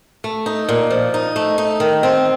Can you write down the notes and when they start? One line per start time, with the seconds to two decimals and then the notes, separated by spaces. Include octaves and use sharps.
0.24 A3
0.46 D#4
0.69 A#2
0.90 F3
1.14 D#4
1.36 A3
1.58 D#4
1.80 D#3
2.03 C4